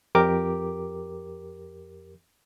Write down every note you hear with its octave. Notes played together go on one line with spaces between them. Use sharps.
F2 G4 A#4 D6